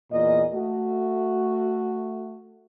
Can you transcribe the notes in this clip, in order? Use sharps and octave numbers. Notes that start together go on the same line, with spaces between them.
E2 A#2 A#4 D#5
A3 F#4